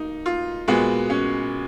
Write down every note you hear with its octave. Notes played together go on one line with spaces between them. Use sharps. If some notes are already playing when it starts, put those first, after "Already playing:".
Already playing: A#3 D#4
F4
A#2 G#3 B3 F#4
C#4